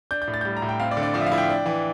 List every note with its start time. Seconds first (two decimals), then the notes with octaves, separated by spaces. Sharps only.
0.11 D4 G6
0.22 G6
0.27 A2
0.34 A6
0.41 G6
0.45 G3 A6
0.57 A#5
0.62 A2
0.69 G5
0.80 C4 F5
0.91 D5
0.97 D3
1.03 D5
1.14 F3 D5
1.21 E5
1.26 F5
1.32 E4
1.38 G5
1.50 D4
1.66 E3